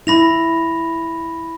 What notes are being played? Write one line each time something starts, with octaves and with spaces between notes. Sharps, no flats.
E4 B5 A#6 F7